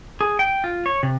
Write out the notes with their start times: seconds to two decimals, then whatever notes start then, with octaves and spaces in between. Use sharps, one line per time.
0.21 G#4
0.39 G5
0.64 F4
0.86 C#5
1.03 C3